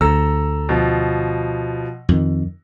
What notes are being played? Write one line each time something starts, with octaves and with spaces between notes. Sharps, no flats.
D2 A4 A#5 E6
B2 F3
F2 D#3